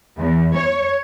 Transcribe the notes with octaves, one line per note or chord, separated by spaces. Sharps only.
E2
C#5